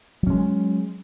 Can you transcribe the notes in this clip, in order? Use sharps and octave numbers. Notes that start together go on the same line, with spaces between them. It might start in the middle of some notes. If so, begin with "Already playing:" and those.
F#3 G#3 C#4